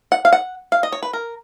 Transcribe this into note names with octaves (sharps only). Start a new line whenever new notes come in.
F#5
F5
F#5
F5
D#5
C#5
B4
A#4